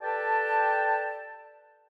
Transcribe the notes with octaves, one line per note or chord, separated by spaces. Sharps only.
G4 A4 B4 D5 G5 A5